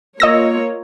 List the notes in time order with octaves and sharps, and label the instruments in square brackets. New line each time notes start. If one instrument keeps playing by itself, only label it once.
[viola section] A#3 F4 C#5 [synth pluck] D#5 E6 A#6